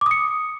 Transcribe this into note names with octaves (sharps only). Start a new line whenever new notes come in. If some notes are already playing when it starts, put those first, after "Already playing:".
D6 D#6 C#7